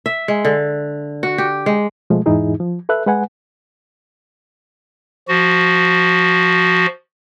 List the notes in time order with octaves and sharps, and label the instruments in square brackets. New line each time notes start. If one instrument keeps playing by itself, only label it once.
[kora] E5
G#3
D3
F#4
G4
G#3
[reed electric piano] B2 F3 G#3 A3
E2 G#2 E3 D#4 E4 G#4
F3
A4 B4 E5 F#6
G#3 B4 F#5 G#5
[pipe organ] F3 F#4